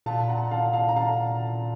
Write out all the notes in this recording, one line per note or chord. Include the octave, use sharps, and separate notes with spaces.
A#2 F5 A5
F#5 A#5
F5 A5
F5 A5
A#5
F5 A5